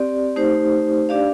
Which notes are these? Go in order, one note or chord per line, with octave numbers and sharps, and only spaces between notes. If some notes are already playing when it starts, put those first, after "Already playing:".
Already playing: C4 G4 D5
A3 D#4 G4 C5
D4 G4 D5 F5